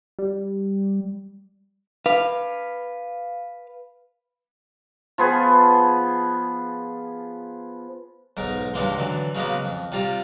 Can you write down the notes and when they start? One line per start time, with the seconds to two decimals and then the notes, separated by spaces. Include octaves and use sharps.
0.19 G3
2.06 B4 F5
5.18 F3 B3 G#4
8.37 B1 G#2 A#4 A#5
8.74 C#2 G2 E3 G#3 A#3 C6
8.99 D3 E3 F#3
9.35 C#3 F#3 G#3 A#3 B3
9.65 F2
9.92 C3 G3 F4 A#5